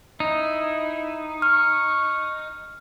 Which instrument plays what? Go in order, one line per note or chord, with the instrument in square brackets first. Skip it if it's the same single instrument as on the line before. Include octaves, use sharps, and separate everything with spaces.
[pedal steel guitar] D#4 [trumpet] E4
[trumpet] C#6 [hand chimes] F6